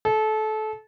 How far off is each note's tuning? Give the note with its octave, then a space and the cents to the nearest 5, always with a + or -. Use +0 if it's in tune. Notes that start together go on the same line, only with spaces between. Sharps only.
A4 -25